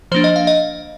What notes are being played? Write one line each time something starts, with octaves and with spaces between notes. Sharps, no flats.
F3 A#3 D4 C5
D#5
F5
D#5